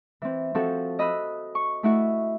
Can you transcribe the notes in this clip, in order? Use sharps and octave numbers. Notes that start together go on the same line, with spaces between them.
E3 C4
F3 C4 F#4 A4
D#5 B5 E6 F#6
C#6
A3 E4 F#4